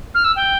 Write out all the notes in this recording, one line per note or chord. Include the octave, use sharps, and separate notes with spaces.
F6
E6
G5